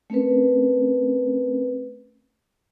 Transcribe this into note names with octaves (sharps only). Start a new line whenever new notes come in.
A3 C4 C#4 A#4 B4